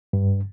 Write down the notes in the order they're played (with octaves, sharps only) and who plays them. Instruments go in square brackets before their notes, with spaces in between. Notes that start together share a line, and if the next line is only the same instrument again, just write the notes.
[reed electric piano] G2